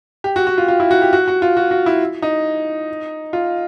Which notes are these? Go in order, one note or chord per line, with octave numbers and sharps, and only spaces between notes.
G4
F#4
F#4
F4
F4
E4
F#4
G4
F#4
F#4
F4
F#4
F#4
E4
D#4
F4